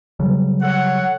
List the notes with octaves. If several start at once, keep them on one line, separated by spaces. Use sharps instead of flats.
C#3 F#3 G3
A4 C#5 F#5